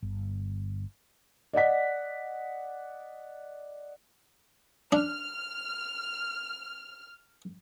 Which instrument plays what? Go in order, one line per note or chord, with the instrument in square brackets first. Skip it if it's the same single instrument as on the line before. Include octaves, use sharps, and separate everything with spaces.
[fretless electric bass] G1
[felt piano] D5 D#5 F#5 B6
[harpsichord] D4 [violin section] F6